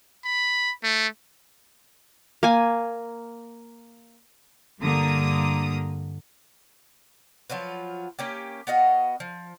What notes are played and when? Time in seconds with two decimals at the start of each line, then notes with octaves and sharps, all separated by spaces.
0.25 B5
0.83 A3
2.43 A#3 G#5
4.81 G2 D3 A#3 A#5 D#6
7.50 F3 F#3 F4 B4
8.19 A#3 C#4 G4
8.67 B3 F#4 D#5 F5
9.20 F3